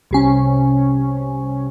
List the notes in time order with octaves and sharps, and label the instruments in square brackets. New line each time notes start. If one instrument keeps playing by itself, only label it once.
[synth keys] C2 C3 C#4